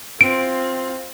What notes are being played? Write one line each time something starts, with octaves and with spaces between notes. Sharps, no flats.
C4 F4 D7